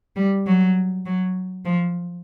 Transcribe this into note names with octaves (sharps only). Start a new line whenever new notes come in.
G3
F#3
F#3
F3